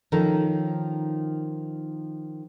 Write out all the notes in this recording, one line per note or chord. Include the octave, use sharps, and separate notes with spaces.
D#3 F3 C#4 D#4 A4